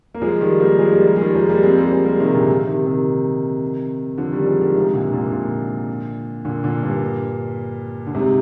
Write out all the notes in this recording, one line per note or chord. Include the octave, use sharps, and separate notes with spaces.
A#3
F3 G#3
D#3 G3
G3 A#3
F3 G#3
G3 A#3
G3 A#3
G#3
D#3 G3
F3 G#3
G3 A#3
G#3 C4
G3 A#3
G#3 C4
G3 A#3
C3 D#3
A#2 D3
C3 D#3
C3 D#3
D3 F3
D#3 G3
F3 G#3
D#3 G3
G#2 C3
A#2 D3
A#2 D3
A#2 D3
A#2 D3
A#2 D3
G2 A#2
D3
G#2 C3